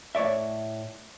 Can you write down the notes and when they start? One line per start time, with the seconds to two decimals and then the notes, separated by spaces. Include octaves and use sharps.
0.15 A2 C#5 D5 E5